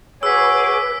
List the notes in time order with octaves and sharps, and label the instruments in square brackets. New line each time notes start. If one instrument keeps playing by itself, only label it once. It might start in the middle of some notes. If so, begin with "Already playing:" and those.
[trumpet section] F#4 C#5 [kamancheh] G#4 D6 [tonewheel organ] B4 [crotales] E6 B6